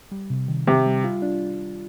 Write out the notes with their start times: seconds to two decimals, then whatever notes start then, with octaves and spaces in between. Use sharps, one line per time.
0.11 G3
0.30 C3
0.48 D#3
0.67 C3 D#3
0.86 G3
1.04 F4
1.22 D4